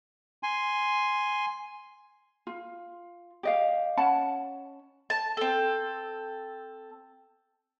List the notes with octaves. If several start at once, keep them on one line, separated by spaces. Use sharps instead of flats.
G#5 C6
F4
G4 D#5 F5
C#4 F#5 A5 B5
A5
C4 A4